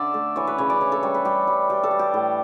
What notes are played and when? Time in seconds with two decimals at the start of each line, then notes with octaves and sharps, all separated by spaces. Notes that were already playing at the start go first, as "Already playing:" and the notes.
Already playing: D3 D5 E5
0.14 A3
0.36 E3 C#5
0.47 B4
0.58 C#3 C#5
0.70 D5
0.81 E3 C#5
0.92 A4
1.03 G3 C#5
1.14 B4
1.25 G3 G4
1.47 G3
1.70 G3 G4
1.83 A4
1.91 G3
1.99 G4
2.14 A2